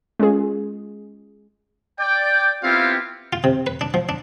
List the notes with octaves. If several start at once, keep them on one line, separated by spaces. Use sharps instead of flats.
G#3 C#4 F4 G#4
D5 G5
B3 C4 E4 F4 G4 F5
F4
C3
B4
D4
F3
D4